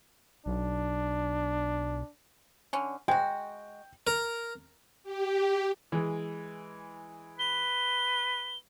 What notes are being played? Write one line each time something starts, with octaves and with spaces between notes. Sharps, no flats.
B1 D4
D3 C#4
G#3 F#4 G5
A#4
G4
E3 G#3
B4 G7